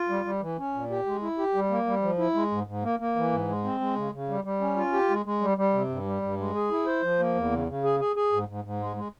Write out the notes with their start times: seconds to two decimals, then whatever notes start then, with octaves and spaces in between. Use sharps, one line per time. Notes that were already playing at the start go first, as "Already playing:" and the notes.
Already playing: F4
0.09 G3
0.25 G3
0.41 E3
0.58 C#4
0.74 A#2
0.90 G4
1.06 G#3
1.22 E4
1.38 G4
1.55 G3
1.70 A#3
1.87 G3
2.02 F3
2.18 E4
2.34 G#3
2.51 G#2
2.67 G#2
2.84 A#3
3.00 A#3
3.16 E3
3.32 G#2
3.48 G#3
3.64 C4
3.80 G#3
3.96 C#3
4.12 C#3
4.29 G3
4.44 G3
4.61 C#4
4.77 F4
4.93 G4
5.10 G#3
5.26 G#3
5.41 G3
5.57 G3
5.73 C3
5.90 G2
6.06 G3
6.22 G2
6.38 G#3
6.55 G#4
6.71 E4
6.86 C5
7.03 F3
7.19 A#3
7.35 E2
7.51 C#3
7.68 C#3
7.84 G#4
8.00 G#4
8.16 G#4
8.32 G#2
8.48 G#2
8.64 G#2
8.80 G#3
8.97 G#3